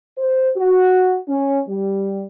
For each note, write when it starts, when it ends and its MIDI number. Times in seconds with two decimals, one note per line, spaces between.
0.18 0.50 72
0.56 1.18 66
1.28 1.60 61
1.69 2.24 55